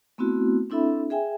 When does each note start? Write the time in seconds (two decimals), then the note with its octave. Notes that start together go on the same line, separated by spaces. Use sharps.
0.18 A3 B3 C4 E4 F#4
0.70 C4 D4 E4 A4 E5 B5
1.10 G#4 E5 G5 G#5